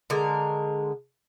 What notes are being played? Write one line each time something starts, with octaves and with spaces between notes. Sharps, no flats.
D3 G#3 A#4